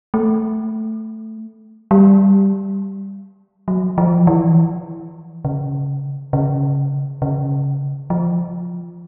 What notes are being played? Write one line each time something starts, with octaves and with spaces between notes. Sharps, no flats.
A3
G3
F#3
F3
E3
C#3
C#3
C#3
F3